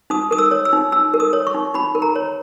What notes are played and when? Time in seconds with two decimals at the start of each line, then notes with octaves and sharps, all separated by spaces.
0.10 D#4 D#6
0.31 A#4 D#6
0.38 E6
0.51 C#5
0.65 E6
0.73 D#4
0.92 D#4 E6
1.14 A#4
1.20 D#6
1.33 C#5
1.47 C#6
1.54 D#4
1.74 D#4 B5
1.95 A#4
2.02 A#5
2.16 C#5